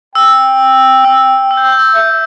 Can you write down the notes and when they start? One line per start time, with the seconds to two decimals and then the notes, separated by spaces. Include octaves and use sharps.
0.15 G5 E6
1.05 E6
1.51 E6
1.57 G6
1.64 E6
1.72 G6
1.79 E6
1.95 E5 G6